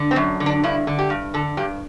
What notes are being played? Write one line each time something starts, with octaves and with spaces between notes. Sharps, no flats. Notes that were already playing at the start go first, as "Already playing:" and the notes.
Already playing: D3
C4
F#2
D3
D4
G2 E4
D3
G4
G2
D3 A4
G2 G4